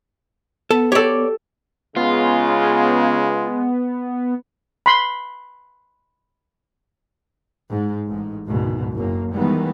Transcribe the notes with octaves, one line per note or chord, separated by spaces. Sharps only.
B3 A4
G4 A4 C#5 D5
C#3 G#3 B3 F4
B5 C6
G#2
A1 G#2
F#1 D2 G#2 B2
F#1 F#2 A#3
D#3 E3 G3 G#3 B3